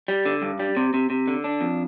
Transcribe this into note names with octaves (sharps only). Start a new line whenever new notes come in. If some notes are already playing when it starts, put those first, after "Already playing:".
G3
D3
G2
G3
C3
C3
C3
D3
D4
F2